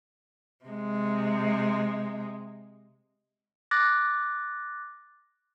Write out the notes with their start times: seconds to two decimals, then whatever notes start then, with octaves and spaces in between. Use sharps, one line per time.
0.65 C3 G#3
3.71 D6 F#6 A6 A#6